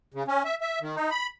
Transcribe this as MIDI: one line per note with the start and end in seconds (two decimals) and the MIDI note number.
0.14 0.23 49
0.28 0.43 61
0.45 0.55 76
0.61 0.79 76
0.82 0.95 51
0.95 1.10 63
1.11 1.27 83